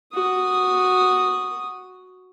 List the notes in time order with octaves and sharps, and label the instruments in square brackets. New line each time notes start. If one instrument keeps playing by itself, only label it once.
[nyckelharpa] F#4 D#6